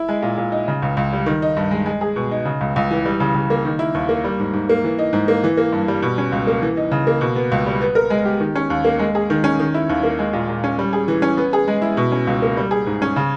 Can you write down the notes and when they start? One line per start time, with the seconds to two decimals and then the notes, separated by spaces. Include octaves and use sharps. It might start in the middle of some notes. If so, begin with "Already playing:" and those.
Already playing: E4
0.09 G#3
0.22 A#2
0.38 A#2
0.52 D#4
0.68 C#3
0.82 C#2
0.97 C#2
1.13 G3
1.26 D#3
1.42 D#4
1.57 G2
1.71 G#3
1.86 G#3
2.01 G#4
2.16 B2
2.31 D#4
2.45 C#3
2.61 C#2
2.76 C#2
2.91 E3
3.06 G3
3.20 C#3
3.35 C#3
3.50 A#3
3.65 D#3
3.79 E4
3.94 D#2
4.09 A#3
4.24 G3
4.40 G#2
4.53 G#2
4.69 A#3
4.84 E3
4.99 D#4
5.13 G#2
5.28 A#3
5.44 E3
5.57 A#3
5.72 G2
5.88 G3
6.02 B2
6.18 C#4
6.32 C#2
6.47 A#3
6.62 E3
6.77 D#4
6.91 C#3
7.07 A#3
7.21 B2
7.36 B3
7.52 C#2
7.66 G3
7.81 B3
7.95 A#4
8.10 G#3
8.25 G4
8.40 D#3
8.56 C#4
8.70 D#2
8.85 A#3
8.99 G#3
9.15 G#4
9.30 D#3
9.44 C#4
9.60 D#3
9.74 E4
9.89 D#2
10.03 A#3
10.19 G#3
10.33 A#2
10.49 A#2
10.64 C#4
10.79 G3
10.93 G#4
11.08 E3
11.22 C#4
11.37 B3
11.53 G#4
11.68 G#3
11.82 E4
11.97 B2
12.12 C#4
12.27 C#2
12.42 A#3
12.57 G3
12.71 G#4
12.86 G#2
13.02 C#4
13.16 C#3